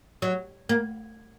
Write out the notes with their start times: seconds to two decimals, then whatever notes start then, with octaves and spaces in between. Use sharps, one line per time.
0.22 F#3
0.69 A#3